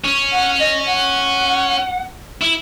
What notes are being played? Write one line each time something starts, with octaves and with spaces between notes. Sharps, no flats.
C#4
F#5
D#5
F#5
E4